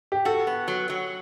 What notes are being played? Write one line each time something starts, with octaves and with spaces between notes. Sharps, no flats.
G4
F#4 A4
B3
F#3
F#3